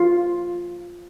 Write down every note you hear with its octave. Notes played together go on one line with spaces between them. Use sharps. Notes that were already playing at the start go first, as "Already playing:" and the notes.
Already playing: F4